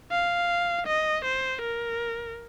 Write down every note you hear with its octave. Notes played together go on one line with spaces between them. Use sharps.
F5
D#5
C5
A#4